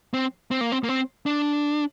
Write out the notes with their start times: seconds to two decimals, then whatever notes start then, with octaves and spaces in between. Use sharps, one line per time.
0.14 C4
0.51 C4
0.61 A#3
0.72 C4
0.84 A#3
0.89 C4
1.26 D4